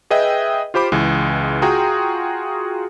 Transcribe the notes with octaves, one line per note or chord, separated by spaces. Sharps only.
G#4 B4 D#5 E5 G5
F4 G4 C5 B5 D6
C#2 E3 G#3
F4 F#4 G#4 G5 A#5 D#6